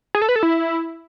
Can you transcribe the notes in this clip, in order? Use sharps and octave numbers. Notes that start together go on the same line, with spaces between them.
G#4
A4
B4
A4
E4